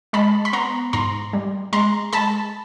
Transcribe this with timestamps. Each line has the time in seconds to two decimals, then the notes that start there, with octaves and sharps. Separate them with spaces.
0.13 G#3 A5 B5
0.45 B5
0.53 B3 A#5 C6
0.93 G#2 A#5 C6
1.33 G3
1.73 G#3 A#5 C6
2.13 G#3 A5 B5